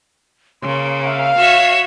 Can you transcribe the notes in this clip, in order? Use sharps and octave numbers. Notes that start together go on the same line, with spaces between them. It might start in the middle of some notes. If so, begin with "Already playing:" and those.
C#3 A#3 C6
E5 F5
F#4 C#5 E5 E7